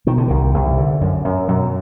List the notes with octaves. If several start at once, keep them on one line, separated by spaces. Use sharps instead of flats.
B2 D#3
D3
C2 D#3
C2
D3
F#2
F#2
F#2 B2 F#3